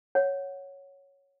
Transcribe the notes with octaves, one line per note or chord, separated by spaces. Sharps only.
C#5 F#5